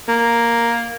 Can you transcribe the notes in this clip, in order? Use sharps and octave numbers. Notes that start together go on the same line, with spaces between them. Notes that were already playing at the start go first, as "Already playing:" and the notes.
A#3